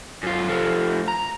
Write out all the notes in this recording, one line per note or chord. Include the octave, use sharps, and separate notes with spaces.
F#2 F4
F3 A3
A#5